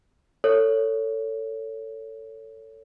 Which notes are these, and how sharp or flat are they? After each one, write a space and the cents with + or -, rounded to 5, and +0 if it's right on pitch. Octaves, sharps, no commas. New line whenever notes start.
A4 +25 C#5 +10